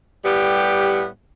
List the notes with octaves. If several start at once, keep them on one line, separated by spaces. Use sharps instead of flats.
A2 G3 B3 G4